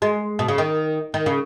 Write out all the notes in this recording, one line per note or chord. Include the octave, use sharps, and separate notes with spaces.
G#3
B2
C#3
D#3
D#3
C#3